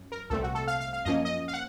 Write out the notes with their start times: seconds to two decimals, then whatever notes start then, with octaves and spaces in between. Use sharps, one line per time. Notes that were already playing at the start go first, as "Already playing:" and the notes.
Already playing: F#2
0.12 A#4
0.30 C2 A#2 A3 C4 A4
0.43 F#4
0.55 A4
0.67 F5
0.80 F5
0.93 F5
1.05 F#2 F3 A#3 C#4 D#5
1.25 D#5
1.48 F5
1.53 F#5